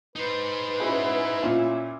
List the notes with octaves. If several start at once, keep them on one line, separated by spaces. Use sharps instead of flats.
D#4 B4 C5
C#4 E4 F#4 G#4
A#2 C#4 F4